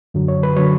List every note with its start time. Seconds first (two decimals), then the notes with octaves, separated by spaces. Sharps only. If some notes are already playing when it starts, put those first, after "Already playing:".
0.14 F#2 D3 F#3
0.28 C#5
0.43 B4
0.56 D3 F#3 C#5